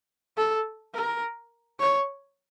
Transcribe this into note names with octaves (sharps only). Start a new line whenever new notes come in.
A4
A#4
C#5